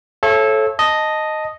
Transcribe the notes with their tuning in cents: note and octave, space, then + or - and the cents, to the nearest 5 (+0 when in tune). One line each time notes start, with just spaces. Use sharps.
A4 -15 C#5 -30 E5 +40
D#5 +0 A5 +0